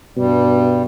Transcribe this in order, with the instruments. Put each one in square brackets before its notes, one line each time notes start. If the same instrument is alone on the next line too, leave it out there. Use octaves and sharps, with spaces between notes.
[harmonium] G2 G3 [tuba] B2